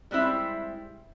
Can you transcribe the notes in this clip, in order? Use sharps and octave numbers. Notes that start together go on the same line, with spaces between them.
G3 G#3 C4 E4 E5